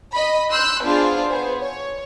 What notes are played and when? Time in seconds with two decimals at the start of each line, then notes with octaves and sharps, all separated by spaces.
0.13 D#5 B5
0.50 C6 E6 F#6 G6
0.82 B3 D4 F4 G#4 C5
1.28 B3 G#4 C5
1.61 C#5